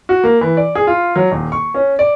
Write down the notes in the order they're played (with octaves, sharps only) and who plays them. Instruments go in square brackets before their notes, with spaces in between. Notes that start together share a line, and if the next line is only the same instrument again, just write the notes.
[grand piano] F#4
A#3
E3
D5
G#4
F4
F#3
D#1
C#6
C#4
D5